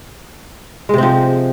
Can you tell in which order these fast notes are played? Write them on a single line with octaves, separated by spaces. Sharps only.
G#3 C3 C4 F3